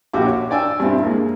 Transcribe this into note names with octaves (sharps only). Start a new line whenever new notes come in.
A#1 F#4 G4 G5 D6
C#5
D5 G5 G#5 E6
G2 C4 E4
G#3 A#3